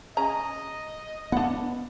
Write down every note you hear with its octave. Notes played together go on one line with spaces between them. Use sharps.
C#4 G#4 D#5 A#5
B3 D4 F#5